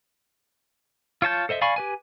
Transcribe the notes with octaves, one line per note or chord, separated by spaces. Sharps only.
F4 C#5 A5 G6
A4 C5 D#5 E5
D5 F5 G#5 B5 C#6
G4 B4 G#5